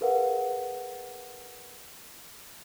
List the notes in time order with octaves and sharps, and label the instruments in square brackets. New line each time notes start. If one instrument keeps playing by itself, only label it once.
[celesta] G#4 A#4 B4 F5 F#5